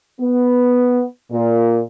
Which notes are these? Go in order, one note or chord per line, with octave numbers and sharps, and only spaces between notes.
B3
A#2